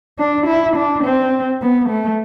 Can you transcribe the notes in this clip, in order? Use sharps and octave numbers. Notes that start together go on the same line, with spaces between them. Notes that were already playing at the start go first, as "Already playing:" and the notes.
D4
E4
D4
C4
B3
A3